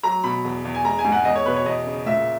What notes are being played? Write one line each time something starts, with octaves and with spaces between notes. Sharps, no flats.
F#3 A#5
B2 B5
E2
E2
G#5
G#3 A#5
G#5
G#2
F#5
E2 D#5
C#5
B2 B4
C#5
E2 D#5
C#3
A#2 E5